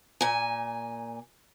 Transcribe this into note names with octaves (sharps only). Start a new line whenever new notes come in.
A#2 G#5